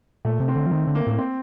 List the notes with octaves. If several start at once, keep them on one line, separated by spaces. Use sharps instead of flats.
A#2 A3
C3
C4
D3
F3
D#3
D3
A#3
A2 A#3
C4